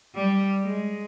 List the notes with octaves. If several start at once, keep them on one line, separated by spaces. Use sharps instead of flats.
G3
G#3